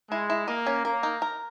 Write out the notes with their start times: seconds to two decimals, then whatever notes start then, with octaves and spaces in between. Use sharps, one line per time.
0.11 G#3 E4
0.30 E4
0.47 A#3 D#5
0.66 C#4
0.85 A#3 A#4
1.03 D#4
1.22 A#4